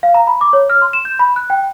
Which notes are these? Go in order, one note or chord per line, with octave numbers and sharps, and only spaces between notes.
F5
A#5
B5
D6
C#5
F6
C6
E7
G6
B5
F#6
G5